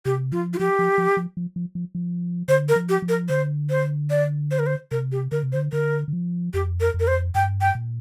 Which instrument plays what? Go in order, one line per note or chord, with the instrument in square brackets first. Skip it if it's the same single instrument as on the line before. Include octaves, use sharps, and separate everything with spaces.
[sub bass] C3 [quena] G4
[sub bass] F3 [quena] F4
[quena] F4
[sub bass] F3 [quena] G4
[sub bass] F3
F3
F3
F3
F3
F3
F3
[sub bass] D3 [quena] C5
[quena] A#4
[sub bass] F3
[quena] G4
[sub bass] F3
[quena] A#4
[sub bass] D3 [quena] C5
[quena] C5
D5
C5
A#4
C5
[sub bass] C3 [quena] A#4
[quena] G4
[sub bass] D3 [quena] A#4
[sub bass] C3
[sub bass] D3 [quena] C5
[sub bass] D3 [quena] A#4
[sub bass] D3
F3
[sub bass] F2 [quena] G4
[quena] A#4
[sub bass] F2
[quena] A#4
C5
[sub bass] G2 [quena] G5
[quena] G5
[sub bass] A#2